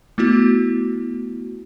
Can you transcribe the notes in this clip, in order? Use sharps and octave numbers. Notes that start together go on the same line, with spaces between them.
A3 B3 E4 F#4